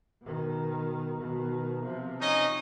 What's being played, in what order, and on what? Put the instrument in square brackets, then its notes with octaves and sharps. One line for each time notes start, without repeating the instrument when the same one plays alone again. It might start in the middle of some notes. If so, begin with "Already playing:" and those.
[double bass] B2 D#3
B2 D#3
C3 F3
[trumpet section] C#4 D#4 D#5